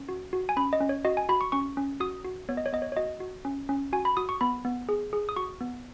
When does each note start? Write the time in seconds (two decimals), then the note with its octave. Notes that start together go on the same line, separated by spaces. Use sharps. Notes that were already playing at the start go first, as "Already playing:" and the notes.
Already playing: C#4
0.09 F#4
0.33 F#4
0.49 G#5
0.57 C#4 B5
0.73 D#5
0.81 C#4
0.89 C#5
1.05 F#4 D#5
1.17 G#5
1.29 F#4 B5
1.41 C#6
1.52 C#4 C#6
1.77 C#4
2.00 F#4 D#6
2.25 F#4
2.49 B3 C#5
2.57 D#5
2.66 C#5
2.73 B3 D#5
2.82 C#5
2.92 C#5
2.97 F#4 D#5
3.20 F#4
3.45 C#4
3.69 C#4
3.93 F#4 G#5
4.05 B5
4.17 F#4 D#6
4.29 C#6
4.41 B3 B5
4.65 B3
4.89 G#4
5.13 G#4
5.29 D#6
5.36 F#4 C#6
5.61 B3